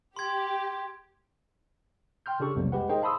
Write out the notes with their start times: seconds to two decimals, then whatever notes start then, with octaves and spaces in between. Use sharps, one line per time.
0.16 G4 C6 G#6
2.26 G5 C6 F6 G6
2.40 C#3 D4 G4 A4 C#6
2.55 B1 F2 C3 F#3 G3 A#3
2.72 G#3 G4 B4 F#5
2.90 D#4 G#4 A#4 C5 D#5 G5
3.02 F5 A5 B5 C6 D#6 E6